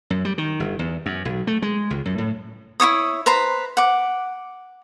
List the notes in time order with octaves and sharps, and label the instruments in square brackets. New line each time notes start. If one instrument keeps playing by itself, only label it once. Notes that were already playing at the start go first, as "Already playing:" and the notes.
[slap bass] F#2
G3
D#3
G1
E2
F#2
B1
A3
G#3
C#2
F#2
A2
[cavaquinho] E4 F#4 C#5 D#6
B4 C5 A#5 B5
F#5 D6